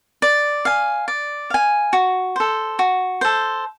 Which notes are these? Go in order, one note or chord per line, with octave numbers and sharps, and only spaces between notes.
D5
F5 G#5
D5
F5 G#5
F#4
A4 C5
F#4
A4 C5